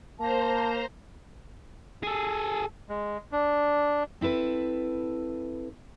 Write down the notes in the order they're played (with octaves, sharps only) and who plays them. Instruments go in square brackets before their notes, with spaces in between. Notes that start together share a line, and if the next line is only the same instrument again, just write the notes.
[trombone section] A#3 [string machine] C5 A#5 [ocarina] A5
[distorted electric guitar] G#4 A4
[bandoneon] G#3
D4
[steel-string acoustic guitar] C4 E4 A4 B4